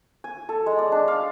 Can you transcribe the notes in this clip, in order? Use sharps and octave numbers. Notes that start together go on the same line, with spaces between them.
G#5
A4
G#3
D5
D4
F5